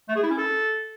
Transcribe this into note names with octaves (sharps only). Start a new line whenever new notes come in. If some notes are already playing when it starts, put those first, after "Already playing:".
A3
G#4
E4
C#4
A4